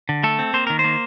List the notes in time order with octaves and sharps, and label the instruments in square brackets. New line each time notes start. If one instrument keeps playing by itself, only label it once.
[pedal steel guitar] D3
A3 A4
C4
A#3 C5
D#3 A#4
C5
A#3